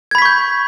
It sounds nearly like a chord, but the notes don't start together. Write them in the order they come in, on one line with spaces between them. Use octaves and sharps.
G#6 B5 B6 C#6 G6